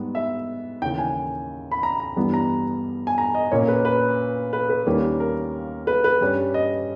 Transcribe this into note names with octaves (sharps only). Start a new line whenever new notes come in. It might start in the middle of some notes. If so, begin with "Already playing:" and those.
Already playing: G#2 G3 B3
E5
D#2 C#3 E3 G5
G#5
B5
A#5
A#5
G2 E3 G3 B3
A#5
G#5
A#5
D#5
A#2 A#3 C#4 C#5
A#4
B4
B4
B4
B4
D#2 D#3 G3 A#3 C#4
A#4
B4
B4
G2 G3 C#4
D#5